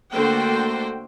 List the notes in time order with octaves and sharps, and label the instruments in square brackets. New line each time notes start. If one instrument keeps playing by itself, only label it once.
[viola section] D3 A3 A#3 F#4 C5 G5